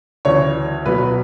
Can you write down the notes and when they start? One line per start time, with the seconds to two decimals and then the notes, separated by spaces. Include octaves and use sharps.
0.25 D2 C#3 E3 C#5
0.86 B1 B2 F#3 B4